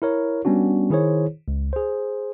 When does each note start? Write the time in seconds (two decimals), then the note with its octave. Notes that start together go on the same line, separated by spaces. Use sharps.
0.02 E4 A#4 C#5
0.45 G3 B3 C#4 D4 F#4
0.90 D#3 E4 G#4 C5 C#5
1.48 C#2
1.73 G#4 C5